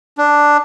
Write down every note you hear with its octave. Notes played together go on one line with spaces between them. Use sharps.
D4